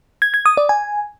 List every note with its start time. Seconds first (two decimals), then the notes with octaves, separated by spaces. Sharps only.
0.22 G#6
0.34 G#6
0.46 D#6
0.57 D5
0.69 G#5